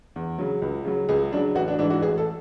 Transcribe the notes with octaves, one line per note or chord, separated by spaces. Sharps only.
E2
C#3 F#3
C#2
C#3 F#3
C#2 G#4
C#3 F#3 D4
A1 F#4
D4
G#2 E3 D4
F#4
A1 G#4
A4